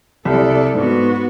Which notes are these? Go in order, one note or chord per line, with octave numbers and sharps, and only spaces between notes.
C2 A4 D5
G#2 B3 F#4